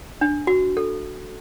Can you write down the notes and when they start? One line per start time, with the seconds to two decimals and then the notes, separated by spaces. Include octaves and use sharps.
0.21 D4
0.47 F#4
0.77 A4